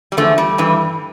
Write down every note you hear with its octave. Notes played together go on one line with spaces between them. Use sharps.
G3
E2 D3 F3 A3
G3
G2 E3